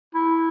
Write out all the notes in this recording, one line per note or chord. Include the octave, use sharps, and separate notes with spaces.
E4